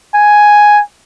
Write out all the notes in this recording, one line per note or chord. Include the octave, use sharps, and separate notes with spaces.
G#5